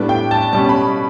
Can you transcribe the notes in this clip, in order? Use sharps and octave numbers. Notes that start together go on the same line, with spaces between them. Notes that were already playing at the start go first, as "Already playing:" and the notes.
Already playing: A2 G3 B3 D4
G5
A5
B2 G3 C#4 A5
B5